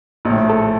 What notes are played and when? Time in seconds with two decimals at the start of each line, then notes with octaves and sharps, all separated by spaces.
0.25 A#1 A2
0.49 A4